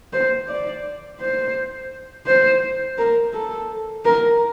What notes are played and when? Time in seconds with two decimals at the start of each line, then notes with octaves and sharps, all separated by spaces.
0.13 C5
0.48 D5
1.20 C5
2.27 C5
2.98 A#4
3.34 A4
4.05 A#4